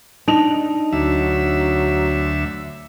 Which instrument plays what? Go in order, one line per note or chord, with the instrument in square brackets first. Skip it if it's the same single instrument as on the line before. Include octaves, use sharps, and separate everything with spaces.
[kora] D4 [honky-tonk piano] D#4 F7
[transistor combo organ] D2 E5 [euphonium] F#3